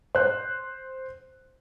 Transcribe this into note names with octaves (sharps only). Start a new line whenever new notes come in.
C5 F#6